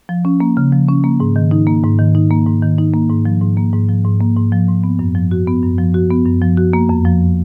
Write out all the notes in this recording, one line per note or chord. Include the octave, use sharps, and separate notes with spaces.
F3
C#4
A#3
C#3
F3
C#4
A#3
G#2
D#3
D#4
A#3
G#2
D#3
D#4
A#3
G#2
D#3
D#4
A#3
G#2
F3
G#2
A#3
G#2
F3
G#2
A#3
G#2
F3
G#2
B3
F#2
F3
F#4
B3
F#2
F3
F#4
B3
F#2
F3
F#4
A#3
F2
F3